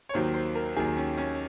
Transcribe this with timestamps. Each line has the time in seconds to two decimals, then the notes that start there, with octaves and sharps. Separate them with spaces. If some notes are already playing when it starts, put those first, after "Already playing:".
0.09 C#5
0.14 D#2 D#3 F#3 C5
0.34 C5
0.55 A#4
0.76 D#2 D#3 F#3 G#4
0.97 C#4
1.17 C#4